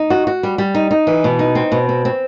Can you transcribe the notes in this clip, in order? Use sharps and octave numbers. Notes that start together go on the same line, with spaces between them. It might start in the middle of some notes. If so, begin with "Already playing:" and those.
Already playing: D#4
F#4
F#4
G3
G3
D#4
D#4
E3
B2
D#4
C4
B2
C4
C4